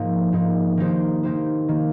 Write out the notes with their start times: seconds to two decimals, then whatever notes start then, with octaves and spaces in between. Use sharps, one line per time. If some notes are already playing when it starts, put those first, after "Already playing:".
Already playing: G#2 F3 A#3 D#4
0.32 G#2 F3 A#3 D#4
0.77 D#3 A#3 D#4 G4 C5
1.23 D#3 A#3 D#4 G4 C5
1.68 D#3 A#3